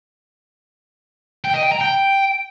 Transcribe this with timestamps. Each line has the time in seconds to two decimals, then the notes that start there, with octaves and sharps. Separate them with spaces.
1.45 G5
1.54 D#5
1.63 G5
1.72 A#5
1.81 G5